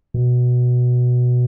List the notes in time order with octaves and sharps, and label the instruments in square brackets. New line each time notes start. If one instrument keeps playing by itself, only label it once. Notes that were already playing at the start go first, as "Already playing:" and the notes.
[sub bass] B2